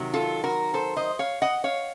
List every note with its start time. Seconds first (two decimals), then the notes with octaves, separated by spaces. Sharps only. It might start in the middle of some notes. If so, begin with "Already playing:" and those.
Already playing: C3 D#3 F#3
0.13 F4 A4
0.44 F#4 A#4
0.74 A4 C5
0.96 C5 D#5
1.19 C#5 F5
1.42 D#5 F#5
1.64 C#5 F5